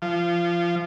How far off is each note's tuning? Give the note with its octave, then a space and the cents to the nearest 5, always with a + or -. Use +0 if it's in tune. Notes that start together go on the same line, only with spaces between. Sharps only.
F3 -20